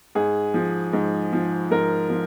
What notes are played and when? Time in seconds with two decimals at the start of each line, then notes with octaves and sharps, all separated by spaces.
0.15 G#2 G#4
0.54 F3
0.93 G#2
1.33 F3
1.71 G#2 A#4
2.10 F3